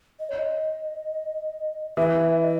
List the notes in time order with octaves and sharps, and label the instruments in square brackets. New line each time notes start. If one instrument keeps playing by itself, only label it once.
[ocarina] D#5
C#5
D#5
[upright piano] E3 [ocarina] E5
[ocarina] D#5